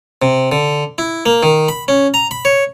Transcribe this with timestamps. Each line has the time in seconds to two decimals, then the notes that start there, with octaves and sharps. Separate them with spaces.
0.22 C3
0.52 D3
0.98 E4
1.26 A#3
1.43 D#3
1.69 B5
1.88 C#4
2.14 A#5
2.31 B5
2.45 C#5